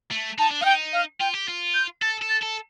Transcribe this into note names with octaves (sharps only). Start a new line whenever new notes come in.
A3
D#4 A5
D4
D#4 F5 G5
F5
F4 G5
G4
F4
G6
A4 A6
A4
A6
A4